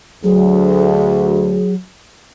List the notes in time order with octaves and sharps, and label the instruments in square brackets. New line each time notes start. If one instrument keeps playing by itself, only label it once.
[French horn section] D2 [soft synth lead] F#3 [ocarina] G#4